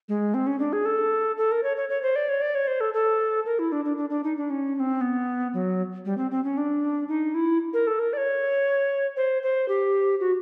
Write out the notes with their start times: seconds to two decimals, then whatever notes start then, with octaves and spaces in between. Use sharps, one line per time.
0.09 G#3
0.34 C4
0.47 C#4
0.59 D4
0.73 G#4
0.85 A4
1.38 A4
1.52 A#4
1.63 C#5
1.77 C#5
1.89 C#5
2.02 C5
2.16 D5
2.29 C#5
2.41 D5
2.55 C#5
2.67 C5
2.81 A4
2.94 A4
3.46 A#4
3.59 E4
3.72 D4
3.85 D4
3.98 D4
4.10 D4
4.24 D#4
4.37 D4
4.50 C#4
4.75 C#4
4.80 C4
5.01 B3
5.54 F#3
6.05 G3
6.18 C4
6.31 C4
6.44 C#4
6.58 D4
7.08 D#4
7.34 E4
7.74 A#4
7.87 A4
7.99 A#4
8.13 D5
8.17 C#5
9.17 C5
9.43 C5
9.69 G4
10.20 F#4